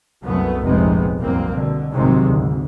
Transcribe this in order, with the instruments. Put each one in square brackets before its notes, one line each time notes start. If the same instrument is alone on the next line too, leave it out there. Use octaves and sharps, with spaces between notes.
[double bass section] C2 F#2 A3 B3
F1 A#1 G#2 C3 G#3 B3
C2 F#2 A#3 C4
B2 D3
A#1 G#2 C3 D#3 F#3 G#3
G#1 D2